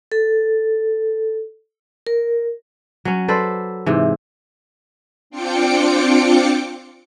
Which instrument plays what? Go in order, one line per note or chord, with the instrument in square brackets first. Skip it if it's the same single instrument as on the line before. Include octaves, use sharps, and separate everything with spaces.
[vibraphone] A4
A#4
[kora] F#3 C#4
A4 B4 C5 D5
G#2 C3 E3
[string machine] C4 D4 F4 G5 D6 C#7